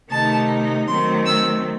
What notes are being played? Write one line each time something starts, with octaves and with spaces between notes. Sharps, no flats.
C3 D#3 A3 D#4 A5
D#3 F#3 A3 C4 C6
E6